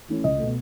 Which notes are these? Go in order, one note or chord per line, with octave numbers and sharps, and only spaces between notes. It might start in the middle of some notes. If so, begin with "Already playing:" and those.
E3 A3 C#4 E4
C#2 D#5
B2 A3